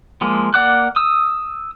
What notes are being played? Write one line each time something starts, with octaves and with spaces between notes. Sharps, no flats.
F3 G#3 A#3
A#3 D5 F#5 D6 F#6
D#6 E6